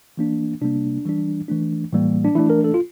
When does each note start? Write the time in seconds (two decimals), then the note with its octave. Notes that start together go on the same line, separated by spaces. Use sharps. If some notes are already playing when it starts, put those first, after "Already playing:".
0.17 E3 A#3 D4
0.61 C3 G3 A#3 D4
1.05 E3 G3 D4
1.48 E3 A3 D4
1.93 A2 E3 G3 A#3
2.24 D4
2.35 E3 A3 D4 E4
2.50 A#4
2.64 A4
2.74 F4